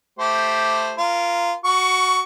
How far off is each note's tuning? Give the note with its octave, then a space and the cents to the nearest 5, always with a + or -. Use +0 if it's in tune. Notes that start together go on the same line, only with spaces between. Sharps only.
A3 +0 G4 +0 C5 +0
F4 -15 A#4 +0
F#4 +0 C#6 +20